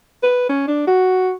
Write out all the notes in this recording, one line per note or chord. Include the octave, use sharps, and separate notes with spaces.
B4
C#4
D4
F#4